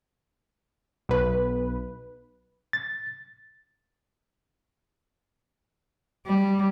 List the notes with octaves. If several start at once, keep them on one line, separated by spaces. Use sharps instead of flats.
B1 B4
A6
G3